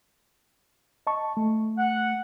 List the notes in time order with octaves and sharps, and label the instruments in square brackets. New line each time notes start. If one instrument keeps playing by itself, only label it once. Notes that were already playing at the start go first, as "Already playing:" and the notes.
[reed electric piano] D#5 A5 C#6
A3
[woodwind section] F#5